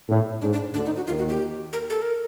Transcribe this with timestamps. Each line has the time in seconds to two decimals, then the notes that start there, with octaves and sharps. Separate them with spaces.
0.09 A2
0.41 G#2 D4
0.53 D4
0.74 D2 D3 D4
0.86 D#4
0.96 F#4
1.07 D#2 D#3 F4
1.18 F#4
1.29 G4
1.73 A#4
1.90 A4
2.02 A#4